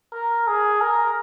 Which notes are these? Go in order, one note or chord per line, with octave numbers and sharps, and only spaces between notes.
A#4
G#4
A#4